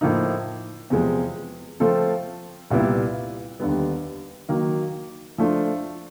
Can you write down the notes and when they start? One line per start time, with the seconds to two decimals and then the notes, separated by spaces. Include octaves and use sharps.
0.01 A2 F3 A#3 D#4
0.90 E2 C3 F3 G#3
1.80 F3 A3 C4 F4 A4
2.71 C2 A#2 G3 B3 E4
3.60 D#2 D3 G3 B3
4.49 D#3 F#3 A#3
5.38 F3 A3 D4 F4